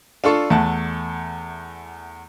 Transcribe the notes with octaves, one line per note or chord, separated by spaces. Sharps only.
D4 F4 A4 C#6
E2 A3 F#5 A5